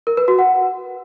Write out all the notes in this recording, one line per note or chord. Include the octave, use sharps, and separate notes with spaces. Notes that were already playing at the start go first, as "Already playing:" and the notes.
A#4
B4
F#4
F#5